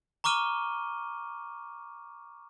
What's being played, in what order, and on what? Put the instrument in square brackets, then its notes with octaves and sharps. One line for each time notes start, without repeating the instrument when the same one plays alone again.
[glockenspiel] A#5 C#6 D6 F6 D#7 G7